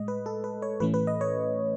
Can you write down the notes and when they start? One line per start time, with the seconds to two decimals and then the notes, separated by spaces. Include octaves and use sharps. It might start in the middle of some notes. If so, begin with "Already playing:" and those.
Already playing: A2 G#3 D#5
0.08 B4
0.26 A4
0.44 B4
0.62 C#5
0.80 A2 E3 A3 C#4 B4
0.94 B4
1.07 D#5
1.21 C#5